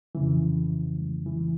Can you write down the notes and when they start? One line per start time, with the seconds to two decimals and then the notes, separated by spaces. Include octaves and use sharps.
0.15 F2 C#3 E3
1.26 E3